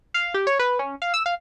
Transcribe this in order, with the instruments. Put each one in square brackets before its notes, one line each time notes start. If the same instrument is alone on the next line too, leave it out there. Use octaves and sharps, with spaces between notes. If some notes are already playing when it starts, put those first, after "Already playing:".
[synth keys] F5
G4
C#5
B4
C#4
F5
E6
F5